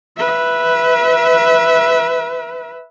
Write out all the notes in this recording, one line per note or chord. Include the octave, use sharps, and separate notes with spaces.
B4 E5